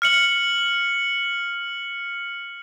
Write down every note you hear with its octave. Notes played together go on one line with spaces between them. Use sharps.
F6 C#7 F#7